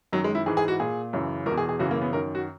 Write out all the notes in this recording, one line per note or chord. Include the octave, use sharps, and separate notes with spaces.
F#2 D#3 F#3
G#3
E4
G#2 E3 G#4
G#4
F#4
A#2 G#4
F#2 C#3 E3
E2 B2 A#4
G#4
G#4
F#2 C#3 E3 F#4
A#3
B3
F#2 D#3 A#4
F#4